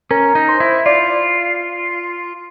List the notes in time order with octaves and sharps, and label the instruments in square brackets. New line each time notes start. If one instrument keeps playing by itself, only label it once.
[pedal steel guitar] C#4 [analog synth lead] A#4
[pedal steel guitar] D#4
[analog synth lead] C5
[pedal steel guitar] E4
[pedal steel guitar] F4 [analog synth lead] D5